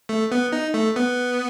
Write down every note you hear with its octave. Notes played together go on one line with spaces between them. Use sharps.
A3
B3
D#4
A3
B3